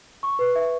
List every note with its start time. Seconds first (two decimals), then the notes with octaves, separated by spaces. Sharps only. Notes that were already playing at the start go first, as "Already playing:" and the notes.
0.23 C#6
0.39 B4
0.55 E5